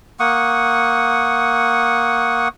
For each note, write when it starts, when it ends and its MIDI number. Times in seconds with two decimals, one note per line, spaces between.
0.20 2.48 58
0.20 2.48 78
0.20 2.48 85
0.20 2.48 87